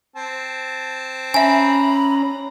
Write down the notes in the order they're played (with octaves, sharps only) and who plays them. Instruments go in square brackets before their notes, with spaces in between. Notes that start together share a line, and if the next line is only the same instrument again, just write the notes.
[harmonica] C4 A5
[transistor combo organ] C#4 A#5 [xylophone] E5 G#5 [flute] B5